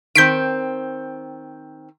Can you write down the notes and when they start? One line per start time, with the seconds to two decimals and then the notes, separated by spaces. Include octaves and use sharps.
0.15 D#3 C4 G6 B6 D7